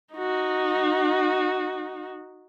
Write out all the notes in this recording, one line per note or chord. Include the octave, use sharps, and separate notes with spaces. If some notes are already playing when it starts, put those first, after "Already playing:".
D#4 F#4